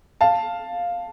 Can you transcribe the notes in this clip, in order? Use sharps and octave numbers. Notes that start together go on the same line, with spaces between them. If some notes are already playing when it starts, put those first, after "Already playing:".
F5 A5